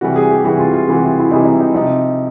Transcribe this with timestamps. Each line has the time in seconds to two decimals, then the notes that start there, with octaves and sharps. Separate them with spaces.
0.01 C3 E3 G3 F#4
0.16 G#4
0.31 G4
0.44 C3 E3 G3 F#4
0.59 F4
0.73 F4
0.88 C3 E3 G3 F#4
1.05 F4
1.19 E4
1.31 C3 E3 G3 D#4
1.45 D#4
1.60 D#4
1.74 C3 F3 D#4